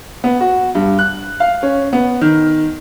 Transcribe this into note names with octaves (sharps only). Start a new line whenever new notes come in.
B3
F#4
G2
F#6
F5
C#4
B3
D#3